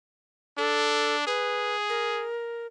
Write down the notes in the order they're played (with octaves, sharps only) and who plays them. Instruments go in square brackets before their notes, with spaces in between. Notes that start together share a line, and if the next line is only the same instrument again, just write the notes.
[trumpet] D4 [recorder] A4
[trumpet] G#4 [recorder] B4
[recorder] A#4